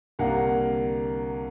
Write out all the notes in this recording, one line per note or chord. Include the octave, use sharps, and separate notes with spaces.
C2 D3 A#3 F5 F#5 A#5